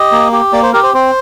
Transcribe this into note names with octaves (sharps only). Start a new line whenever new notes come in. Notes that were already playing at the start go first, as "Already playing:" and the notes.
Already playing: G4 D#5
A#3
G4
A#3 D5
C5
G4 A#4
C5
C4 C5